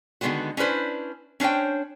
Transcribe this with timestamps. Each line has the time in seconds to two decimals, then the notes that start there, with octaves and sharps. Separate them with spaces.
0.21 D3 D#3 F#3 G#3 B3 F#4
0.57 C#4 D4 E4 B4 C5
1.40 C#4 D4 C5 C#5 G5